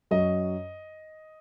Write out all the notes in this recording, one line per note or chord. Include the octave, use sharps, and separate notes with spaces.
F#2 F#3 D#5